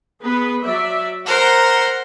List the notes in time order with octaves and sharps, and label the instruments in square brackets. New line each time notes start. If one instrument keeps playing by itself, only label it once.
[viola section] B3 G#4 B4
F#3 D5 E5
[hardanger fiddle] A#4 C5 [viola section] F#5 A#5